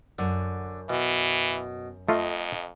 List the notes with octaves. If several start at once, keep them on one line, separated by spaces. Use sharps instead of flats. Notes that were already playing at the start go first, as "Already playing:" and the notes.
F#2 D3
B2 E3
F2 A3 F4 D#5